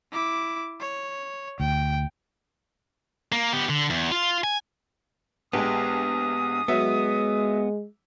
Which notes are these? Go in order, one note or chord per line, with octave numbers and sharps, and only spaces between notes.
E4 D6
C#5
D2 G5
A#3
B3 G4
D3
E2
F4
G#5
A#1 G#3 B3 G4 D#6
F#3 G#3 B3 E5